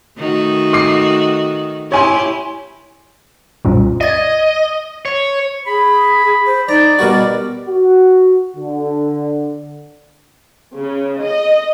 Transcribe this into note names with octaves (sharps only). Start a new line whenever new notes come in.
D#3 A3 F#4
D6 C7
E4 G4 C#5 G#5 C6
C2 F#2 A#2
D5 D#5 G#6
C#5
G#4 B5
C5
D#4 D5 A#5
B2 G3 F#4 A#4
F#4
D3
C#3
D#5